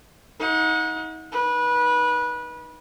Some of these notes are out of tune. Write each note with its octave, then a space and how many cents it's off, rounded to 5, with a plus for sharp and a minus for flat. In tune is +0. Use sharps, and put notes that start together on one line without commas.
D#4 +35 F#5 -35
D#4 +0 B4 -25